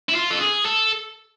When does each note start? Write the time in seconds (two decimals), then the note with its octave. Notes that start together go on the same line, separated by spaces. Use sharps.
0.09 E4
0.14 F4
0.31 A4
0.40 G#4
0.65 A4